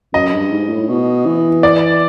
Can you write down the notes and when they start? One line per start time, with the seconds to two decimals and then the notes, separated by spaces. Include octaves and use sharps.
0.13 F#2 D#5
0.33 G2
0.51 G#2
0.69 A2
0.89 B2
1.26 E3
1.63 D5